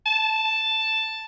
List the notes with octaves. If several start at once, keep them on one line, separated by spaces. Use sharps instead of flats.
A5